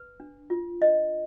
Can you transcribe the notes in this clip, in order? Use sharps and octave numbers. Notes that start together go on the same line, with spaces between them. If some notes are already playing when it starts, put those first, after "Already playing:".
Already playing: B4
D4
F4
D4 D#5